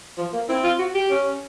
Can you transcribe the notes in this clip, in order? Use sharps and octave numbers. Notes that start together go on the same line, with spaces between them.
F3
A#3
C4 E4
F4
F#4
G4
C#4